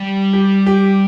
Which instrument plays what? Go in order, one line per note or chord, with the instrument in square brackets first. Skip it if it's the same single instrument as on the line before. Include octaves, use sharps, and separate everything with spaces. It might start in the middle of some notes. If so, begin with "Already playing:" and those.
Already playing: [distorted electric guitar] G3
[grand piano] G4
G4